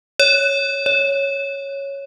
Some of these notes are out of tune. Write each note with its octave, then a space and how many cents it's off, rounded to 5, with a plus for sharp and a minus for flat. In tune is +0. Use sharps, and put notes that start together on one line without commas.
C#5 +0
C#5 +0